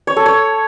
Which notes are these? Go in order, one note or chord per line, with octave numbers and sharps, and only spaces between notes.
C#5
A4
C#5